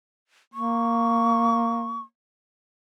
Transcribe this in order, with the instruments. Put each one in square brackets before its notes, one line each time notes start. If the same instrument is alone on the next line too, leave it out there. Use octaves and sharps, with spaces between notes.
[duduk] A#3 [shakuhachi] C#6